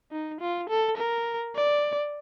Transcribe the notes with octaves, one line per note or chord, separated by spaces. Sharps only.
D#4
F4
A4
A#4
D5